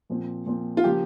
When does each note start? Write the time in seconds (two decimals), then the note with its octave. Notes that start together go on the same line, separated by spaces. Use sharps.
0.10 A#2 F3 C4
0.46 A#2 F3 C4
0.77 F4
0.84 C#3 F3 A#3 G4